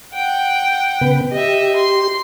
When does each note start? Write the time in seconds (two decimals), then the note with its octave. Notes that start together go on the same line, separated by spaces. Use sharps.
0.13 F#5 G5
1.01 C#3 B3 B4
1.31 G4 D#5 E5
1.76 C6